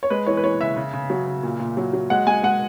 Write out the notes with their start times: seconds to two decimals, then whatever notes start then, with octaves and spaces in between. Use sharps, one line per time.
0.03 C#5
0.10 G#3 B4
0.26 E3 C#5
0.37 B4
0.44 E3 C#5
0.60 C#3 E5
0.76 C#3
0.93 C#3
1.10 F#3
1.27 C#3
1.43 A#2
1.60 A#2
1.77 F#3
1.93 F#3
2.10 G#3 F#5
2.27 G#3 G#5
2.43 G#3 F#5